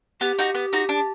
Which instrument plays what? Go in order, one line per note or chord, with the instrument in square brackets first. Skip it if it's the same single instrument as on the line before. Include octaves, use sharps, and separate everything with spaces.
[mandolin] B3 [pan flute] G4
[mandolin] D#4 F#4
B3
D#4 F#4
D4